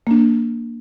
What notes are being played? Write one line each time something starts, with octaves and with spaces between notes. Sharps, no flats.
A#3 D4